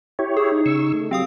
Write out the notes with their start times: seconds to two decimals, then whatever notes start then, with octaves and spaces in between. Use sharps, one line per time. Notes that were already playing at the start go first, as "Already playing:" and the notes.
0.19 E4 G4 C#5
0.37 G#4 E6
0.52 D#4
0.66 C#3 C#6 E6
0.94 A3
1.11 F#3 C4 G4 F5 D#6